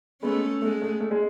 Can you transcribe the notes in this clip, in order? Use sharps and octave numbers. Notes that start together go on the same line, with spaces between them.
G#3 A3 B3 C#4
G#3 A3 B3
A3
A3
G#3